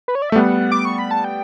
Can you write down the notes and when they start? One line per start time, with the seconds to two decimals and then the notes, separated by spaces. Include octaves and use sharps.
0.08 B4
0.15 C#5
0.22 D5
0.30 E5
0.32 A3
0.36 G3 B3 F#5
0.72 D6
0.85 C#6
0.99 B5
1.11 A5
1.24 G5